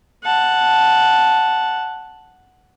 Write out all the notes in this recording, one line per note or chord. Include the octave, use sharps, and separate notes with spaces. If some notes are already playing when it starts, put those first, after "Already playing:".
F#5 A5